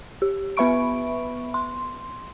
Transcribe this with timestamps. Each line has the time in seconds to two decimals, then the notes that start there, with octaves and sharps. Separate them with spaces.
0.22 G4
0.57 B3 B4 E5 B5 C#6 D7
1.54 C6